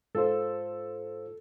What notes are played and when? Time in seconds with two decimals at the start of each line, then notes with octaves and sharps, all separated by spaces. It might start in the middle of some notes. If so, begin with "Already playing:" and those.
0.15 G#2 F4 A4 C5